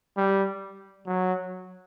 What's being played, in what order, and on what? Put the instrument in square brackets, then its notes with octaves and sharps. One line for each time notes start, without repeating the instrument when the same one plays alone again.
[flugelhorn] G3
F#3